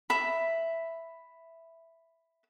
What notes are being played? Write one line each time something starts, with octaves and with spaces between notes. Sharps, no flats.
E5 B5